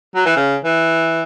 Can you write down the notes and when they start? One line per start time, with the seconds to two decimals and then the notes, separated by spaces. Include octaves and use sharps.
0.15 F#3
0.26 E3
0.36 C#3
0.65 E3